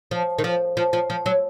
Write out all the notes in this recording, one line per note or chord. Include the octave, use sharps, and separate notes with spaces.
F3
D#3
F3
F3
F3
F3
F#3